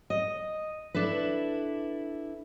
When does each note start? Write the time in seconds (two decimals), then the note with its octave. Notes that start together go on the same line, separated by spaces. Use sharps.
0.10 D#5
0.94 D4 E4 A4 B4